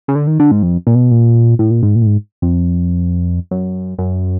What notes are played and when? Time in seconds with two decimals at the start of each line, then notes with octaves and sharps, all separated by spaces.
0.08 C#3
0.15 D3
0.27 D#3
0.39 D3
0.51 G#2
0.63 F2
0.87 A#2
0.95 B2
1.11 A#2
1.59 A2
1.71 A#2
1.83 G#2
1.95 A#2
2.02 A2
2.06 G#2
2.42 F2
3.51 F#2
3.98 F#2